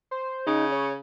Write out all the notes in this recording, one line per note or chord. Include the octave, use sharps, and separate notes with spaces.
C5
C#3 D#4
C#5